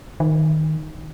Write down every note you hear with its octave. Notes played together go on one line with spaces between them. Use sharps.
D#3